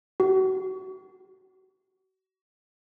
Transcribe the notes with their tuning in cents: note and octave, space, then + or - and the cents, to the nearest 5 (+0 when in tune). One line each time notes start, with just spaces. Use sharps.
F#4 +35